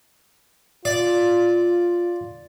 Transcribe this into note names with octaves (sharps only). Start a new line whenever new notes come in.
F4 D5